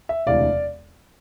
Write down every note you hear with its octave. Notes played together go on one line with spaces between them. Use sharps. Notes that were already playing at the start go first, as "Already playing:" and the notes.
E5
E1 D2 C3 E3 D5 F5